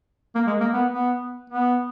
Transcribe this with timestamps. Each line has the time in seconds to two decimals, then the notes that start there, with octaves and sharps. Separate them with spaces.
0.35 A#3
0.47 G#3
0.60 A#3
0.73 B3
0.91 B3
1.50 B3